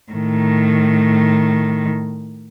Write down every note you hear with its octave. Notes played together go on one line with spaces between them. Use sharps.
A2 D#3